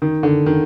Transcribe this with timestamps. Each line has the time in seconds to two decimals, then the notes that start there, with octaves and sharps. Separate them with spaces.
0.02 D#3
0.23 D3
0.46 D#3